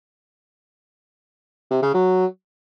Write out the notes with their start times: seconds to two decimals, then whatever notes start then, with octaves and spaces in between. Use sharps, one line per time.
1.71 C3
1.82 C#3
1.94 F#3